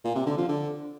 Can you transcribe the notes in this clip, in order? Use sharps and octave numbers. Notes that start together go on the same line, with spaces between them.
A#2
C3
D3
F3
D3